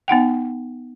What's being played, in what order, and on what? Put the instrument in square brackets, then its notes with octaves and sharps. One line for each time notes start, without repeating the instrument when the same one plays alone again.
[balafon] B3 D#4 F#5 G5